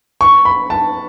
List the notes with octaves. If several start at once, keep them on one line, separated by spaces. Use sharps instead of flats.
C#6
B5
A5